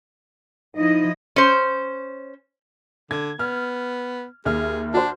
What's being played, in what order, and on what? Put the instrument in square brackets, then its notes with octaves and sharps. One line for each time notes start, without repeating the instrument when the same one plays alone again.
[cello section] F3 E4 D#5 [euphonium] D#4
[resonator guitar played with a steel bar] C#4 C5
[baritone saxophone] D3 [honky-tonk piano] G#6
[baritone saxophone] B3 [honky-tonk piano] F6
[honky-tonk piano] D#2 E5 F6 [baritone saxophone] G#4
[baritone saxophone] D4 [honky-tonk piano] F#4 C5